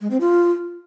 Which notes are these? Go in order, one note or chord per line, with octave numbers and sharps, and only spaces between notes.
G#3
C4
F4